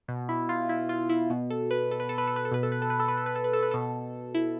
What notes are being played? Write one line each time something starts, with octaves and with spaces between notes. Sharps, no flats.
B2
E4
F4
E4
F4
E4
B2
A4
B4
A4
B4
A4
B4
A4
B4
A4
B2 B4
A4
B4
A4
B4
A4
B4
A4
B4
A4
B4
A4
B4
B2 A4
E4